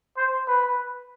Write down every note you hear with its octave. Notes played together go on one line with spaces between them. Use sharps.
C5
B4